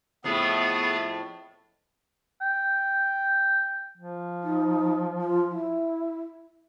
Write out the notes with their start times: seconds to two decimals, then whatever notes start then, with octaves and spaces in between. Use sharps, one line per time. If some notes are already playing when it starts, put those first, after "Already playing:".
0.24 F2 A2 A3 B3 G#4
2.41 G5
3.98 F3
4.43 D#4
5.21 F4
5.51 E4